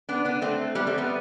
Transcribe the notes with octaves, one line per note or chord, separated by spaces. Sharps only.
B3 D4
B3 D4
A3 C4
G3 B3
A3 C4
G3 B3